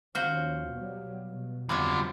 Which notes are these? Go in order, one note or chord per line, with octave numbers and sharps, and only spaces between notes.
D#2 F3 C#4 F#4 C5 F5 F6
B2 F#3 G3
B2
F2 D3 F#3 G3 F4 C#5